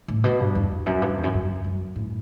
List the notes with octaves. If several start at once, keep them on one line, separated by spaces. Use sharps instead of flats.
A2
B2
G2
E2
E2
F#2
G2
F#2
E2
F#2
F#2
F#2
A2